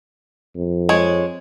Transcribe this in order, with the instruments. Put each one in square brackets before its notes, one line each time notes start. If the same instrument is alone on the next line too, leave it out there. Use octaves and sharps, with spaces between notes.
[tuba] F2
[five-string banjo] G#3 C#5